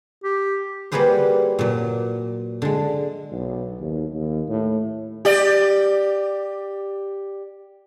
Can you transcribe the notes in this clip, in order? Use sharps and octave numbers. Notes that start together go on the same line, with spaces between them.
G4
G3 A#3 F#4 G#4 B4 C5
A#2 F#3
D3 G#3
B1
D#2
D#2
A2
G4 D5